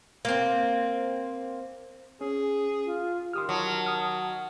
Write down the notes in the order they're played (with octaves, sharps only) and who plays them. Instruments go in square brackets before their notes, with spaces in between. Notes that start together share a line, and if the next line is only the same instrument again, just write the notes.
[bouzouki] A#3 C4
[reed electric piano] C#4 [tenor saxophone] G#4
[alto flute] F4
[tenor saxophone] D#3 [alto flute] G4 [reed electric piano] C6 D#6 F6
[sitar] F#3 [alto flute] A5
[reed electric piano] D#6 F6